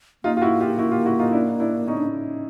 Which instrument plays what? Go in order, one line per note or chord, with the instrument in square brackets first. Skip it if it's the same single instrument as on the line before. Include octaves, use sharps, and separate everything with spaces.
[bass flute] A#3 [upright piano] D#4 F4
[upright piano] F4
E4 F#4
F4 G4
E4 F#4
F4 G4
E4 F#4
D#4 F4
D4 E4
D4 E4
[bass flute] B3 [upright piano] C#4 D#4
[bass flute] D4